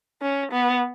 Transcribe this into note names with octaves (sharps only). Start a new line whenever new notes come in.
C#4
B3